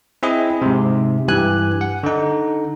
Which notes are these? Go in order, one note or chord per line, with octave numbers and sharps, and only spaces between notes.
C4 E4 G#4 D#5
G#2 C3
G2 E3 G4 G#5 F#6
F#5
D3 D#4